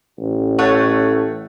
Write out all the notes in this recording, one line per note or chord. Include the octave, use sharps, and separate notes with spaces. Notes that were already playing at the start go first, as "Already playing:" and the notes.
A1
A3 C#5 F#5